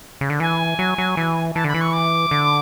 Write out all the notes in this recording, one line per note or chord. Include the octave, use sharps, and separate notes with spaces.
C#3
D3
E3 G#5
F#3
F#3
E3
E3 A5
D3 B5
E3
C#6
D6
D3